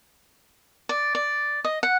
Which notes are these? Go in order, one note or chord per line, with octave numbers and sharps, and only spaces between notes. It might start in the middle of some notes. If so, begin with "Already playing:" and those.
D5
D5
D#5
F#5